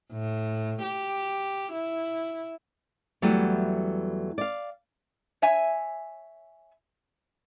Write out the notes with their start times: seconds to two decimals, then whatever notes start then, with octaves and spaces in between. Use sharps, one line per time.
0.12 A2
0.83 G4
1.73 E4
3.22 E2 F#3 G3 A3 B3
4.38 D5 F5
5.42 C#5 E5 G#5